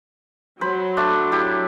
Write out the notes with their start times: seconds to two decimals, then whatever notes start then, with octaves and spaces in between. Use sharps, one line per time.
0.61 F#3 C5 B5
0.97 A3 D4
1.32 E4 G4